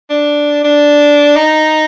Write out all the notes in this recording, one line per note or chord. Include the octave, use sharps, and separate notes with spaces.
D4
D4
D#4